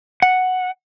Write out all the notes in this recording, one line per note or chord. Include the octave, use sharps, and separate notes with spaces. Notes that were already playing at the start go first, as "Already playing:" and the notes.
F#5